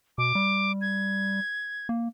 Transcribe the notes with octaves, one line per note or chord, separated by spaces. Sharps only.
B2 D6
G3
G#6
A#3